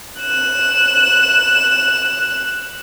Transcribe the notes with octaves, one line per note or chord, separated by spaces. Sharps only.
F#6 E7